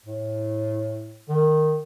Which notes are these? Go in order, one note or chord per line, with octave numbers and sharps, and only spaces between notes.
A2
D#3